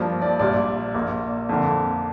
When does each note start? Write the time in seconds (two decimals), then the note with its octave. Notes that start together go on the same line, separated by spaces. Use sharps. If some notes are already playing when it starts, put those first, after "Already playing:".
Already playing: G2 F3 A#3 D4
0.22 D5
0.39 A#1 A#2 G3 D5
0.95 A#1 A#2 A#3
1.49 F2 D3 A#3